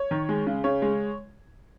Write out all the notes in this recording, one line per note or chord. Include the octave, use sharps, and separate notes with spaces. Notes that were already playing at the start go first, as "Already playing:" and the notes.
Already playing: C#5
D#3
G#3
C#3
C#3 C#5
G#3